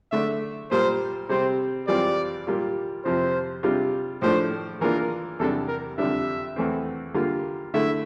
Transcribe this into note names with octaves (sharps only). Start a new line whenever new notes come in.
D3 A3 D4 E5
A#2 G3 A#3 C5
C3 G3 C4 C5
F2 E3 G3 C4 F4 D5
A#2 G3 A#3 F4
F2 C3 F3 C5
C3 G3 D4 F4
A2 F3 A3 D4 C5
E3 A#3 D4 F4 A#4
E2 C3 G3 D4 A4
A#4
F2 D3 G3 D4 E5
E2 E3 A3 C4
D3 G3 A#3 F4
D3 A3 E4 E5